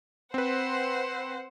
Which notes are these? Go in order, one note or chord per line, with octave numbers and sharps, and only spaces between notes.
C4 B4 C5 F#5